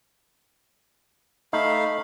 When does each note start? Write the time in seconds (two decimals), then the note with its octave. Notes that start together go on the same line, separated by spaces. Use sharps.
1.53 A3 D#4 F5 B5